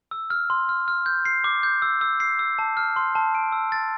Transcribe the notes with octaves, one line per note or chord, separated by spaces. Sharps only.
E6
F6
C6
F6
F6
G6
C7
D6
G6
E6
E6
C7
E6
A5
F6
C6
A5
D7
E6
A6